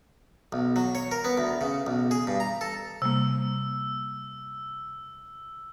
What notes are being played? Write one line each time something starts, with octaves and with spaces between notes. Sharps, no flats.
B1
F#3
C#5
A#4
B3
D2
C#3
B1
G#4
G2
A#5
A4
C3 G3 A#3 E6